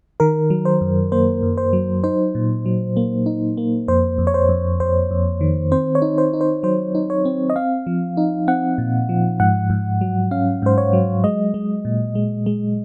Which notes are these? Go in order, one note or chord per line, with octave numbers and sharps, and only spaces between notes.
D#3 A#4
F#3
C5
F#2
A#3 C5
F#2
C5
F#3
D#4 C5
A#2
F#3
A#3
D#4
A#3
F2 C5
F2
C#5
C5
F2
F2 C5
F2
D#3
C4 C5
C#5
D#4
C5
D#4
C5
F#3 C5
D#4
C#5
C4
D#5
C4 F5
F3
D#4
C4 F#5
A#2
F3
G#2 F#5
G#2
F#3
C#4 F5
G#2 C5
C#5
F#3
G#3 D#5
G#3
A#2
G#3
G#3